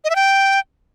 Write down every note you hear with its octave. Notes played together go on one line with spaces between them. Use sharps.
D#5
E5
G5